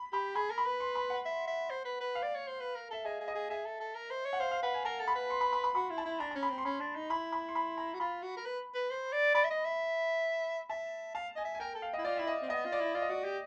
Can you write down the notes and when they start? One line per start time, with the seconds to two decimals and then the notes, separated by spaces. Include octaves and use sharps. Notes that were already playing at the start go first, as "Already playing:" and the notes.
Already playing: B5
0.13 G4 B5
0.35 G#4 B5
0.51 A#4
0.58 B5
0.65 B4
0.80 C6
0.95 B5
1.10 F#5
1.25 E5
1.47 E5
1.70 C5
1.85 B4
2.01 B4
2.15 F5
2.23 D5
2.35 C#5
2.47 C5
2.60 B4
2.75 A#4
2.90 A4 E5
3.05 G#4 D#5
3.20 G#4
3.28 D#5
3.35 G#4
3.50 G#4 E5
3.65 A4
3.80 A4
3.95 A#4
4.10 C5
4.25 C#5
4.33 F#5
4.40 C5 F5
4.51 F5
4.63 B4 F#5
4.74 G#5
4.85 A#4 A5
5.00 A4
5.08 B5
5.15 B4
5.30 C6
5.41 B5
5.53 B5
5.64 B5
5.75 F#4 B5
5.90 E4
5.98 A5
6.05 E4
6.20 D4 A#5
6.31 C#4 A#5
6.43 B5
6.50 C4
6.58 C6
6.65 C#4 B5
6.80 D4
6.95 D#4
7.10 E4 B5
7.32 B5
7.49 C6
7.55 B5
7.78 A#5
7.94 F#4
8.00 F4 B5
8.22 F#4
8.37 A#4
8.45 B4
8.75 B4
8.90 C5
9.13 D5
9.35 D5 B5
9.44 E5
9.50 D#5
9.65 E5
10.70 E5 A5
11.15 F5 A5
11.36 D#5 G#5
11.45 E5
11.55 G#5
11.60 A#4 G5
11.75 A4
11.82 F5
11.93 E4 D#5
12.05 F4 D5
12.17 E4 E5
12.27 D#5
12.42 C4
12.49 B3 D#5
12.65 F4
12.72 D5
12.80 E4
12.95 F4 D5
13.02 D#5
13.09 F#4 D5
13.24 G4